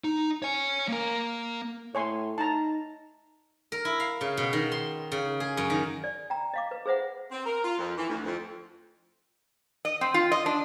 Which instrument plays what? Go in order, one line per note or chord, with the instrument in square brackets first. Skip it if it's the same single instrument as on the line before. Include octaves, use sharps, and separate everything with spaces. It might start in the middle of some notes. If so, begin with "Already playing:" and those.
[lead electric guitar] D#4
C#5 G#5
A#3 A#4
[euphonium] A2 [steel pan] C#5 G#5 C6
[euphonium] D#4 [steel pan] A5 A#5
[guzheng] A#4
E4
F5
C#3
B2
D#3
C6
C#3
G#4
F#2
D#3
[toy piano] D5
G5 A#5
D#5 F5 D6
B4
G#4 B4 C5 E5 F#5
[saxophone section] C4
A#4
F4
F2
E3
D2
F2
[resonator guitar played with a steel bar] D#5
C4
F4
D#5
D4